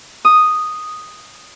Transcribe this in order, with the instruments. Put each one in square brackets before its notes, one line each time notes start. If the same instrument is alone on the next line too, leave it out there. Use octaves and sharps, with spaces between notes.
[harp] D#6